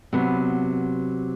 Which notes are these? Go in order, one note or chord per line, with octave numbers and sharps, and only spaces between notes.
C3 F#3 B3